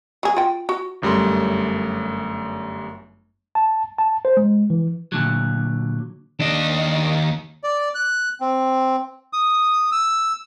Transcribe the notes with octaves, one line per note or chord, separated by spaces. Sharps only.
F#3 G#4
F4 G5
F#4
G1 F#2 G3 A3 C6
A5
A5
C5
G#3
E3
A#2 D3 F#3
D#2 D4 D#5
D5
F#6
C4
D#6
E6